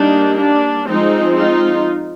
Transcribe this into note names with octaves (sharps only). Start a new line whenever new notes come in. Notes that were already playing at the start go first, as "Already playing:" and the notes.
Already playing: G3 A#3 D4 D#4
D4
F3 G#3 C4 D#4
D#4 F4